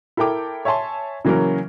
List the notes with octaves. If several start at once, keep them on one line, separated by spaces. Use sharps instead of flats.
E4 A4 A#4 G5 D6
C#5 E5 G#5 A5 C6
C#3 E3 F#3 A#3 C#4 A#4